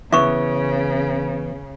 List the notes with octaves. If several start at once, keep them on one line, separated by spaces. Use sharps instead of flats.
C#3 E3 B3 E5 C#6